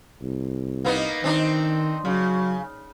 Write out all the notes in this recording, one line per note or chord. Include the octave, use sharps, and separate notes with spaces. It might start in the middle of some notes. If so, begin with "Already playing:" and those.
C2
A#3 B3 D#4
D#3 C4 D4 D#4
C#3 F#3